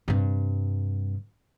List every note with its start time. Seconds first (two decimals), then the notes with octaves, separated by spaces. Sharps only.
0.08 G2 C3